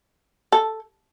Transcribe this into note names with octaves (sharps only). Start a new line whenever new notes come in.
A4